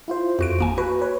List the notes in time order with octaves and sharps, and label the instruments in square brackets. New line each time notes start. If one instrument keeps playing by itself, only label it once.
[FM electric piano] E4 F4 C5
[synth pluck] F2 F#4 D7
G#1 A#3 G#5
[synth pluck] F#4 [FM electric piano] B4
[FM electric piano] B4 C#5